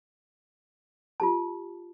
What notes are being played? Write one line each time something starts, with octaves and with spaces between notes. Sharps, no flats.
F4 G4 A5